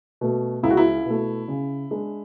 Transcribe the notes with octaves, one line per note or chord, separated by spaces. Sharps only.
B2 A3
C#2 E4
F#4
E4
B2 A3
C#3
G#3 D4